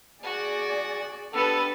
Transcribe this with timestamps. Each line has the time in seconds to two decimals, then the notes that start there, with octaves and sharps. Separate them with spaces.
0.23 F#4 G#4 D5
1.33 B3 D4 G4 A4 B4